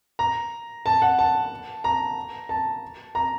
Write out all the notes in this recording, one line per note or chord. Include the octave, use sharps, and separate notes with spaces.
A#5
A5
F#5
A5
A#5
A5
A#5